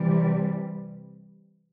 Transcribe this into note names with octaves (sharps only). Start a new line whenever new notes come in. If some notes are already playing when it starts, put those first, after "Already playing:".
Already playing: C3 E3 G3